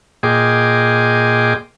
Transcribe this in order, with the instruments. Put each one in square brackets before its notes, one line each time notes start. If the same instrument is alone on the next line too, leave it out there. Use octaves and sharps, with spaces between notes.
[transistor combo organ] A#2 G#4 D#5 G5 C6 D6